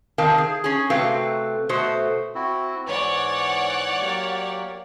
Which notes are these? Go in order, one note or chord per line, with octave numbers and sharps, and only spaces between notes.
C3 D#3 C4 A#4 F5 A5
G#4
C#4 G#4
C3 A3 C4 F#4 B4 F5
B2 A3 F#4 C5
C4 E4 F#4
G#2 E3 C#5 D5 F#5
F#3 A#3 G4